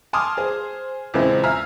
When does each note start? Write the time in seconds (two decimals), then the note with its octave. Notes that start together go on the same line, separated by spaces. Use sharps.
0.13 G#5 A5 C6 D6 D#6 F6
0.37 G#4 C5
1.14 E2 A#2 C#3 G#3 C4 E4
1.43 E5 F5 G#5 A#5 E6 F6